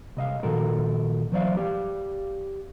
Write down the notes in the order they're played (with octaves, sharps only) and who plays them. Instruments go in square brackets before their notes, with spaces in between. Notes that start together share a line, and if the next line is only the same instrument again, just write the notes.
[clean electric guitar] C2 D#5 F5
A#2 D#3 F3 F#4 A4 A#4
E3 F#3 C5 D5 E5 F5
G4 D5 F5